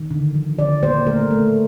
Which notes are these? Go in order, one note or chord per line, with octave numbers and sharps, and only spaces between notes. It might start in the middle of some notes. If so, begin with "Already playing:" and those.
Already playing: D#3
D3
F3
D3 D5
A#3 C5
A3 A#4
A3